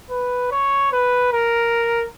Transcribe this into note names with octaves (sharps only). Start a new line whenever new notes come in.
B4
C#5
B4
A#4